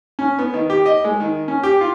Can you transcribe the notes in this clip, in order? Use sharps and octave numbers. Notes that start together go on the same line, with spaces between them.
C#4
B3
D#3
G4
D#5
G#3
D#3
C#4
G4
F4